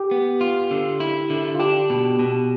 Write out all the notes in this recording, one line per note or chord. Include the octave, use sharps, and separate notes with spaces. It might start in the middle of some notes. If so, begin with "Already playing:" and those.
Already playing: G4
B3
F4
D3
E4
D3
F4
D4 G4
B2
B2